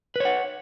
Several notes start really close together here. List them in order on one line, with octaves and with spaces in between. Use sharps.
B4 C#5 F#5